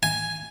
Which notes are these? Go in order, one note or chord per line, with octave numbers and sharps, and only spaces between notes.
G#5